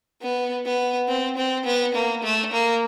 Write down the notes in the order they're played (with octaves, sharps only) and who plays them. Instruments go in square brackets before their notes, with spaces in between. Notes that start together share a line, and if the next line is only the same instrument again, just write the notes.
[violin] B3
B3
C4
C4
B3
A#3
A3
A#3